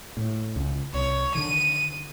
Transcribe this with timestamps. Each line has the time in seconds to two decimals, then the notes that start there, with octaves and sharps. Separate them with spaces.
0.17 A2
0.56 C#2
0.94 C2 C#5
1.35 D3 D#3 D#7